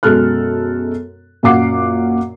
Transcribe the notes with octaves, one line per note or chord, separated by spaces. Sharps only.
F#2 B2 G#3 A4 F6 F#6
F#2 A#2 F5 F#5 D6 C7